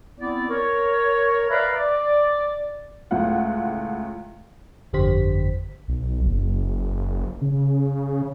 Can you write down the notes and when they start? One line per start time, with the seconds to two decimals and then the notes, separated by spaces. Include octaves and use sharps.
0.20 B3 C4 E4 D5
0.50 A#4 C#5
1.51 B4 D5 E5 F5 A#5 B5
1.74 D5
3.11 C#2 A2 E4 F4 F#5
4.93 G1 F2 D3 G4 C5 B6
5.88 B1
6.25 F#1
7.41 C#3